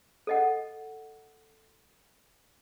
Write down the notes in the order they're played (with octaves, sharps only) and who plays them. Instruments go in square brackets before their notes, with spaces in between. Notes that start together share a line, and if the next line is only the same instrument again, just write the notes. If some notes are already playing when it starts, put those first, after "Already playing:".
[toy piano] A4 D#5 F#5